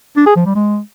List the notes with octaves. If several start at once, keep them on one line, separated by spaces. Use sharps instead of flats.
D4
G#4
F3
G3
G#3